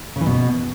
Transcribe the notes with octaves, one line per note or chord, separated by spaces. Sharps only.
C#3
E3
B2